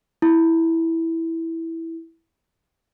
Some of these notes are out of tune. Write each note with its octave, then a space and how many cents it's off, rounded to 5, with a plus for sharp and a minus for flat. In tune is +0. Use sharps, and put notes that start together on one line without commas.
E4 -5